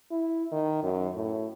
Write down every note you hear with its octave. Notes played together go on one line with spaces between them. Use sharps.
E4
D#3
F#2
A2